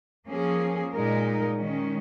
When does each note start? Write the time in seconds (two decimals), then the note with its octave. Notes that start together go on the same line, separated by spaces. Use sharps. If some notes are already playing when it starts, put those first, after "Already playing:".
0.27 F3 A#3 C#4 G#4
0.92 A#2 G#3 D#4 A#4
1.56 D#3 G#3 C#4